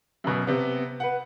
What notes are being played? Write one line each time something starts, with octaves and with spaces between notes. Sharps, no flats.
F#2 B2
C3 B3
B4 F#5